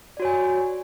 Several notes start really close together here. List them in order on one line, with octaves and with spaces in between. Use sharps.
D5 F#4 C#5 G#5